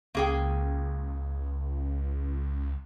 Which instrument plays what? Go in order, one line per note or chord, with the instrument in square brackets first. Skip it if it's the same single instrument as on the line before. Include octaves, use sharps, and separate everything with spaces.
[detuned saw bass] C#2 [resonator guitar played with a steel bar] A#3 G#4 G5